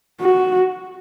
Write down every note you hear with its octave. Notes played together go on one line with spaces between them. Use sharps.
F#4